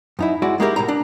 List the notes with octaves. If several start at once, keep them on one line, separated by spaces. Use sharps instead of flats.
F#2 D#4 E4
G#3 E4 F#4 D5
G#3 A#3 E4 G4 A4 A#4
C2 F#2 A2 A#5
D4